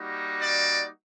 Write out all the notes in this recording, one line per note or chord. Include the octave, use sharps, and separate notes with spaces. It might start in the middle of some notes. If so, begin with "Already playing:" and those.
Already playing: G3 A#3 D#4 F#4
D5